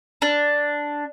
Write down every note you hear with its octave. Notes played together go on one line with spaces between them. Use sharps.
D4